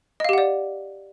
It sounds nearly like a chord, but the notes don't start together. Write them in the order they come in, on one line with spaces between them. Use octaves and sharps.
D#5 F5 G4 F#5 D5